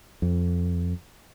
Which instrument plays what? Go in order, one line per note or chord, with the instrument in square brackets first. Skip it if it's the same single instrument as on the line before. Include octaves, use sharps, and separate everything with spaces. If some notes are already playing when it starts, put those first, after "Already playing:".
[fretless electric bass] F2